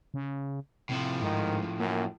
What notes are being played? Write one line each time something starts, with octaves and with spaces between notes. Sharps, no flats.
C#3
A2 C3 F3
G#2 D#3
F#2 A#3